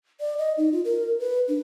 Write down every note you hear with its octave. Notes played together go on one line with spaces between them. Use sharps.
D5
D#5
D#4
F4
A#4
B4
D4